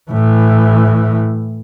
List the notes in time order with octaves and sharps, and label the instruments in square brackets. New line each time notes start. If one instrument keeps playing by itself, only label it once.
[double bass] A2 E3